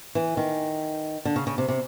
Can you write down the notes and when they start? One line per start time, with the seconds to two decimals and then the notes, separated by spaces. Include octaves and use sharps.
0.15 E3
0.37 D#3
1.25 D3
1.36 C#3
1.47 C#3
1.58 C3
1.68 C3